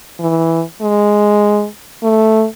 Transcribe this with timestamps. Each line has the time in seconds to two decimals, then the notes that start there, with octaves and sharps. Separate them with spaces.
0.20 E3
0.81 G#3
2.03 A3